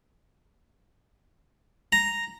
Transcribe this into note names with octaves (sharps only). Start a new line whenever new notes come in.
A#5